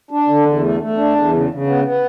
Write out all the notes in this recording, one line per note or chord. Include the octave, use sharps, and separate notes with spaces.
D4
D3
E2
A3
A3
D4
E2
C#3
C#3
B3
B3